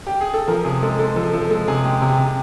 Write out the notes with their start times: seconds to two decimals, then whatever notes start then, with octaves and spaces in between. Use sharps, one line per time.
0.07 G4
0.21 G#4
0.34 A4
0.47 F3 A#4
0.65 C3 G#4
0.82 G#3 A4
0.99 G#3 A4
1.16 F3 A4
1.33 F3 A4
1.50 G#3 A4
1.68 C3 G#4
1.84 G#3 G4
2.02 C3
2.18 C3